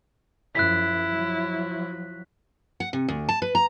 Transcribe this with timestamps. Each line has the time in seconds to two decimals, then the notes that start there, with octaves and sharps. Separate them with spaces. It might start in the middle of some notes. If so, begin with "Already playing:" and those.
0.55 F#2 F3 E4 F#6 B6
1.10 F3 F#3
2.80 F#5
2.93 C3
3.09 D2
3.29 A5
3.42 B4
3.55 A#5